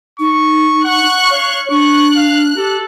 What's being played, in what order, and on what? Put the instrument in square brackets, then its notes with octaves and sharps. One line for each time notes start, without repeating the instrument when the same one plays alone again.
[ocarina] D#4 [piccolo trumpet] C#6
[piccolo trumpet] F#5 [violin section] C#6 F#6
[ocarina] C#5 [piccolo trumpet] F5
[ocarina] D4 [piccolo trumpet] C#6 [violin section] F#6
[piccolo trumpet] F5
[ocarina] G4 [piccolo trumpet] A4